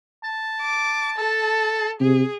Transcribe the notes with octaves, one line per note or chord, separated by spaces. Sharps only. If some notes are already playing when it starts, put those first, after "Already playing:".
A5
D6
A4 A5
C3 G#4